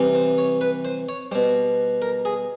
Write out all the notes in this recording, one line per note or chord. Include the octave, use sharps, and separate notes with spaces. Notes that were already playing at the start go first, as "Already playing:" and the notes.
Already playing: C3 E3 G3
C5
C#5
B4
C5
C#5
B2 G3 C5
A#4
G#4